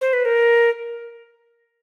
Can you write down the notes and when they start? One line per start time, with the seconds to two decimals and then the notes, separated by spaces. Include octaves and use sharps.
0.01 C5
0.13 B4
0.25 A#4